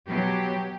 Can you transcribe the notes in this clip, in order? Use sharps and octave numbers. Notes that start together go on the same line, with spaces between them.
B2 F#3 G4